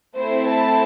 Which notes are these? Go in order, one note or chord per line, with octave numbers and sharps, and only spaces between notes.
A3 C4 E4 C5
A5